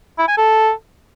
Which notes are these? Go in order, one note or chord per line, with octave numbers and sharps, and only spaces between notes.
E4
G#5
A4